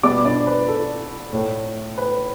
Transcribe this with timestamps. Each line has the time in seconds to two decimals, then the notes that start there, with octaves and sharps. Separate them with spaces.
0.03 B2 G3 B3 D5 D6
0.25 D4 D5
0.47 B4
0.68 A4
1.33 A2 A3
1.98 B4